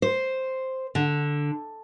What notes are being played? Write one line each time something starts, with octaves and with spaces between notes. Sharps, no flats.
C5
D3